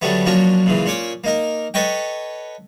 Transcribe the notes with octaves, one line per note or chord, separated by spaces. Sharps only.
D3 F#3 G3 A3 B3
F3 F#3 A#3 C#4 D4 F#4
A#2 C#3 E3
A#2 C#4 C#5 D6
A#3 D#4 A#4
A4 B4 C#5 D#5 G5